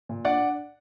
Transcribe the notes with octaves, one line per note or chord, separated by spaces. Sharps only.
A#2
D4 D5 F#5